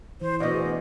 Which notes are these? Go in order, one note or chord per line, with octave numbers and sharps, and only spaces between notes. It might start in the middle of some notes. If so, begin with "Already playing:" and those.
E3 C5
D2 B2 D5 D#5
G#4